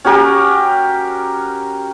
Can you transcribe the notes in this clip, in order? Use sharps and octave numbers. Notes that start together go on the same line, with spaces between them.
C#4 F#4 G4 A#4